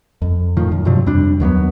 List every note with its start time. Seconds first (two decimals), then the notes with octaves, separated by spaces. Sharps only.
0.22 F2
0.57 A2 D#3 F3
0.72 F#2
0.85 G2 C3 F3 F#3
1.06 F2 G3 D4
1.40 D#2 F#3 A#3 B3